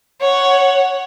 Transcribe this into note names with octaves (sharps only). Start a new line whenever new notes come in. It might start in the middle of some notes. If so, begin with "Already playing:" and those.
C#5 F#5